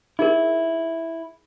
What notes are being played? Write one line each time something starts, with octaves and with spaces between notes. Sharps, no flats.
D#4 E4 G#4 A#4